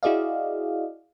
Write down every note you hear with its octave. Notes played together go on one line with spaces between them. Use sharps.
E4 F#4 G#4 D5 D#5 F5